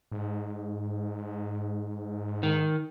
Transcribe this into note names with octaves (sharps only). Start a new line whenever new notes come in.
G#2
D#3